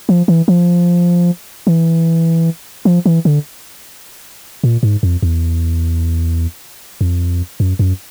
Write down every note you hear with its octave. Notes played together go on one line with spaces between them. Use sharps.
F3
E3
F3
E3
F3
E3
D3
A#2
G#2
F2
E2
F2
F#2
F#2